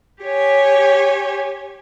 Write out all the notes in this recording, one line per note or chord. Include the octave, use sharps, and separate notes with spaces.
G4 C#5 G#5